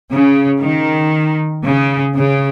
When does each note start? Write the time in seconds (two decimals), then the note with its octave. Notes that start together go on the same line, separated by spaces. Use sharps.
0.11 C#3
0.62 D#3
1.65 C#3
2.17 C#3